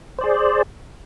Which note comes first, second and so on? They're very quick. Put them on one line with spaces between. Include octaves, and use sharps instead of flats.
C5 D5 G#4